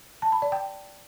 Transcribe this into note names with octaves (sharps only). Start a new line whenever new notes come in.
A5
B5
D5
G5